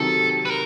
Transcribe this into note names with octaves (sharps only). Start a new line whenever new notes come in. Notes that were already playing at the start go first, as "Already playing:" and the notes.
Already playing: C3 D#3 F#3 A4
B4
A#4